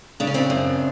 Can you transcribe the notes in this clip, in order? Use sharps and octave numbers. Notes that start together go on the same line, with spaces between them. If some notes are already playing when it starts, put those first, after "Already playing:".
C#3 D4
C#4
C4 D4
F#2